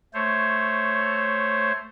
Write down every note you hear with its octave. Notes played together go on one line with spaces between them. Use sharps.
A3 C5 C#5